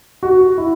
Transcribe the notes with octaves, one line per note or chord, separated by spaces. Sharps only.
F#4
E4